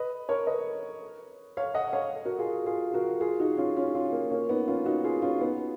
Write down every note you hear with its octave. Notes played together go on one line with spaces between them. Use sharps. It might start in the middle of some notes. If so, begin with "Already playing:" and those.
Already playing: B4 D#5
A#4 C#5
B4 D#5
C#5 F5
D#5 F#5
C#5 F5
F#4 A#4
F4 G#4
F4 G#4
F#4 A#4
F4 G#4
D#4 F#4
C#4 F4
C#4 F4
C#4 F4
A#3
A#3 C#4
B3 D#4
C#4 F4
D#4 F#4
F4 G#4
C#4 F4
B3 D#4